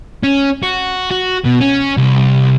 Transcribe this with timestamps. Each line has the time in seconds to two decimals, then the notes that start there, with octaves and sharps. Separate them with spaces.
0.23 C#4
0.63 F#4
1.11 F#4
1.45 B2
1.61 C#4
1.97 C2